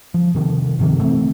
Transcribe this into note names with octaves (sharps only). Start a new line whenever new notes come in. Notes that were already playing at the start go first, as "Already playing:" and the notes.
F3
C3 D#3 F3
G1 C3 D#3
E3 A3 C4